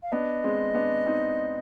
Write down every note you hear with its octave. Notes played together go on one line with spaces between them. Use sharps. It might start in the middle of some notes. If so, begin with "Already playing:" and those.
F5
B3 D4 D#5
G#3 C4
B3 D4
C4 D#4